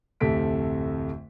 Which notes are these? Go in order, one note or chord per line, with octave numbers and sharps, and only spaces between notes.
D1 F2 C3 A3 B6 D7